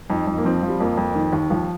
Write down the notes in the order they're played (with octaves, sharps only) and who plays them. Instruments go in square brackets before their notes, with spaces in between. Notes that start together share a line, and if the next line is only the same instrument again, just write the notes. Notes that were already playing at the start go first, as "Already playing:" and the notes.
[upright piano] F2 D#4
F2
A#3
F3 C4
F3
G3
F2 A#3
F2
D#3
D#2
D#2 F3